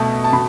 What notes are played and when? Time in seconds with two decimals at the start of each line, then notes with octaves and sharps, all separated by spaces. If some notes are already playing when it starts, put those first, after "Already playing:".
Already playing: B2 A3 A5
0.24 A5
0.33 B2 B5